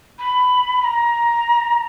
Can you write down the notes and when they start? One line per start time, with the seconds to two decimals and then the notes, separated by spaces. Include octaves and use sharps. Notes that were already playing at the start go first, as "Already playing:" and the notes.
0.19 B5
0.81 B5
0.84 A#5